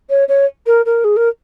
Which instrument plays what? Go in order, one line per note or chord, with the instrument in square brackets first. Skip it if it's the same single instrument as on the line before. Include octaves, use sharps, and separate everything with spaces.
[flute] C#5
C#5
A#4
A#4
G#4
A#4